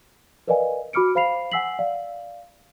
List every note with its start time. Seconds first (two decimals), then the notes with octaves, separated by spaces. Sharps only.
0.47 A#4 B4 D5 D#5 F5 G#5
0.93 F#4 B5 D6 F6 C#7 D7
1.15 C5 F5 B5 C7 F7
1.52 F#5 G#5 E6 B6 C7 F#7
1.79 D5 F5